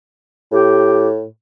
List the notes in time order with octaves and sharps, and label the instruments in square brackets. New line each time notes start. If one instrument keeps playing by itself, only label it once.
[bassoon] A2 [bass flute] G4